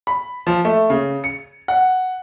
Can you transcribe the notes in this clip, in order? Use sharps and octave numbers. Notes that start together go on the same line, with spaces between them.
B5
F3
A3
C#3
C#7
F#5